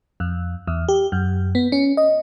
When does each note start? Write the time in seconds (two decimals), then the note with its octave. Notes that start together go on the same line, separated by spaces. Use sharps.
0.20 F2
0.67 E2
0.89 G4
1.12 F#2
1.55 B3
1.72 C#4
1.97 D#5